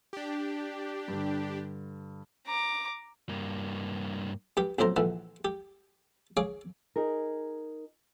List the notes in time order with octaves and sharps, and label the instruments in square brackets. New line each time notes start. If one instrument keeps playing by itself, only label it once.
[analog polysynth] D4 G4
[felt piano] G2 D3
[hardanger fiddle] A#5 D6
[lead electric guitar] G2 A#3
[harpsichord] G2 G4
B1 F2 A2 C5 A#5
A#1 D3 E3
G4
G#4 C#5 F5 D6
[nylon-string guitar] D#4 G#4 A#4